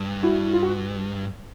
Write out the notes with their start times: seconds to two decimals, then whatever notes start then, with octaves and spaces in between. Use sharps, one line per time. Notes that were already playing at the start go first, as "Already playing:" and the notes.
Already playing: G2
0.23 E4 F#4
0.53 F4
0.63 F#4